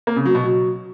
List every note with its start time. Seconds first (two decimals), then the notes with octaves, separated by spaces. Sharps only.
0.07 A#3
0.16 C#3
0.26 F#3
0.35 B2
0.44 F#3